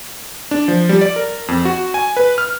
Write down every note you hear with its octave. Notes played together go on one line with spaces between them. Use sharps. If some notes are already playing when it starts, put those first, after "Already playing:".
D4
F3
G3
D5
A#4
F2
F#4
G#5
B4
F6